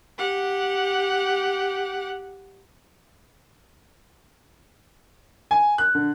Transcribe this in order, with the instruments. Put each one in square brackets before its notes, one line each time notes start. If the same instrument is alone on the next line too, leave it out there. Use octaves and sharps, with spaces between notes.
[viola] G4 F#5
[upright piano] G#5
F#6
D3